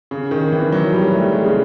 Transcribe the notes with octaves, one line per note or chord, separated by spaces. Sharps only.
C#3
D#3
E3
F#3
G3
A3
G#3
C#3